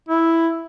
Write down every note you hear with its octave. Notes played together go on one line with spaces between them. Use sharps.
E4